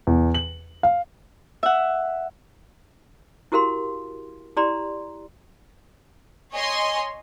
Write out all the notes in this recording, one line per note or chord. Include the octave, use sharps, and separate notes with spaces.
E2
F#7
F5
E5 F#5
E4 F#4 G4 A#4 F5 C6
E4 G4 D5 A#5 C6
C#5 D#5 G#5 C6